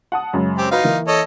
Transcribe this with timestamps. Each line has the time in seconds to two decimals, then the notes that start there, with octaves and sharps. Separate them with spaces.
0.12 F#5 A5 D#6
0.33 F#2 C#3 G#3
0.58 C4 G4
0.71 D#4 F4 F#4 B4
0.84 E3 A#3
1.07 A4 C#5 D#5